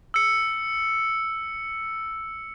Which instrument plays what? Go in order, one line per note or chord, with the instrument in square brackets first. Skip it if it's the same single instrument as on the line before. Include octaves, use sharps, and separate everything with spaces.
[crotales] E6 C#7